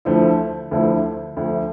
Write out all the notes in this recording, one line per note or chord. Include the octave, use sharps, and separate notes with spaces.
D2 D3 F3 A3 E4
D2 D3 F3 A3 E4
D2 D3 F3